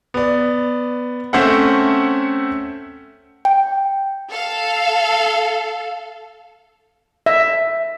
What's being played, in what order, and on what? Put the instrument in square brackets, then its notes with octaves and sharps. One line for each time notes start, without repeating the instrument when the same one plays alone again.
[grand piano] B3 D5
A3 C4 C#4 C5 E5 F#5
[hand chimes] G5
[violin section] A4 F5
[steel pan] E5